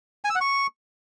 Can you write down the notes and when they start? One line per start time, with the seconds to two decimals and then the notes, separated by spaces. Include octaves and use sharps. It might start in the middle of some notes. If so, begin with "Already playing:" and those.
0.25 G#5
0.30 E6
0.35 F#5
0.41 C#6